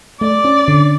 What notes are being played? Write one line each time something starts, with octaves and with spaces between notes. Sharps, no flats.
A3 D5
C#4
D3